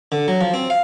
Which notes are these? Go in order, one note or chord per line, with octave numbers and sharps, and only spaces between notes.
D3
F#3
F3
C4
F5